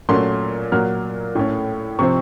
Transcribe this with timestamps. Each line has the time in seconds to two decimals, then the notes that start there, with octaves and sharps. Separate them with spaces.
0.09 A#2 F#3 A3 C#4 C6
0.72 A#2 F#3 A#3 F6
1.35 A2 A3 C#4
1.99 C3 F3 C4 C#6